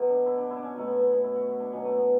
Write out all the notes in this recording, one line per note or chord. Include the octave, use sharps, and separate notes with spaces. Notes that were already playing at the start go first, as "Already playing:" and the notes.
Already playing: B2 F#3 E4 F#4
D4
E4
D4
E4
D4
C#4
B2 F#3 A3
B3
B3
B3
E4
F#4
E4
D4
B2 F#3 C#4
A3
B3